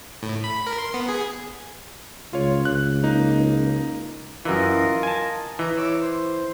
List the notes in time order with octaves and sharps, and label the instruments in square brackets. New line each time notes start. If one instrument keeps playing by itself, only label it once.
[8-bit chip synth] A2
B5
A#4
C6
B3
G#4
[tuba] C#2 [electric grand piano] F4 C#5
[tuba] C#2 [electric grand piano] F#6
[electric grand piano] A#3 D#4
[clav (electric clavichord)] F#2 E3 [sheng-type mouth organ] F4 A#4 D#5
[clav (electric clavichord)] G#5 A5
[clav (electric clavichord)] E3 [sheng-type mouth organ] D#5 A#5
[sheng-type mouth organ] C#5 D6 E6
C5